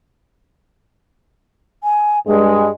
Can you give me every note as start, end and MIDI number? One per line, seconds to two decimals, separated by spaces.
1.83 2.17 80
2.27 2.67 43
2.27 2.67 56
2.27 2.68 68